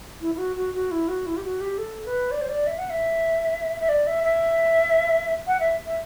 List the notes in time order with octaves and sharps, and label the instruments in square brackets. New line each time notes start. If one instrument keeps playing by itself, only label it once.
[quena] E4
E4
F#4
F#4
F#4
E4
F#4
E4
G4
F#4
G4
A4
B4
D5
C5
D5
E5
F#5
E5
E5
D5
E5
E5
F#5
E5
E5